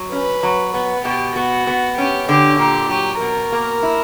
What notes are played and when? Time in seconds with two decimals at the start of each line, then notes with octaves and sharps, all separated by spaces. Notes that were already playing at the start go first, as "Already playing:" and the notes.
Already playing: F#3
0.12 C#4 B4
0.43 F#3
0.74 B3 B4
1.05 B2 G4
1.36 B3 F#4
1.67 B3
1.98 C#4 G4
2.28 D3 G4
2.59 A#2 G4
2.90 F#3 G4
3.21 B2 A#4
3.52 A#3
3.83 E4